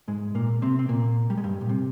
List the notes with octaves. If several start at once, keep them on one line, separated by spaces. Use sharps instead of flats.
G#2 G#3
A#2 A#3
C3 C4
C4
A#2 A#3
G3
G#3
G2 G3
A#2
C3